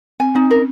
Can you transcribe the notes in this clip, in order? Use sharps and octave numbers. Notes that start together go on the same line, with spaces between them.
C4 G#5
C4 D#4
C#4 A#4